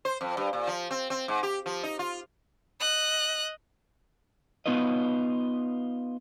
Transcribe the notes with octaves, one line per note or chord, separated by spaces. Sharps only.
C5
F2
G2
A#2
F3
C4
C4
G#2
G4
F3
D#4
F4
D#5 F#6
B3 D#4 F4 B4 D#5